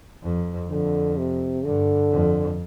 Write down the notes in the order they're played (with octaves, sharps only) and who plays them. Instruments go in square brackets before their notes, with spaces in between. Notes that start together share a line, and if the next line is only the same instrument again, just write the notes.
[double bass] F2
[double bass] F2 [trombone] D3
[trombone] C3
[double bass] G2 [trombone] D3
[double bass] F2